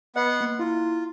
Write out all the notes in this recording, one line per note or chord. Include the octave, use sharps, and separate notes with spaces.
B3 D#5 F#5 C7
A#3
E4 F4